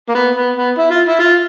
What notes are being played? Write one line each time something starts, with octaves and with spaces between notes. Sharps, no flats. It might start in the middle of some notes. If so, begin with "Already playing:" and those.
A#3
B3
B3
B3
E4
F4
E4
F4